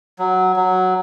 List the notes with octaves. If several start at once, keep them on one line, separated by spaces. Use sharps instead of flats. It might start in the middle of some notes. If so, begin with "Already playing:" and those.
F#3
F#3